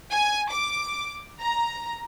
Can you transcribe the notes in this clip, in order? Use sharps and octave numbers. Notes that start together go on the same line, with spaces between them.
G#5
D6
A#5